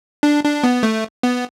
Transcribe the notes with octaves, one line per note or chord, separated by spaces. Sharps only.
D4
D4
B3
A3
B3